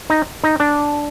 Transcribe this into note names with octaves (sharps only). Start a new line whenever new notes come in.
D#4
D#4
D4